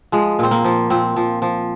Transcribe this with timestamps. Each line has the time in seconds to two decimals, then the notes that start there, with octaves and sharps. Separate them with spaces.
0.12 F3 G#3
0.39 A#2 C4
0.51 A#3
0.64 F3
0.90 A#2 C4
1.16 F3
1.42 F3